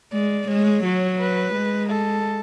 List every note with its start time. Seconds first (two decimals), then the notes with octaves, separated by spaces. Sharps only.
0.13 G#3 D5
0.48 G#3 C#5
0.84 F#3
1.19 B4
1.54 G#3
1.90 A4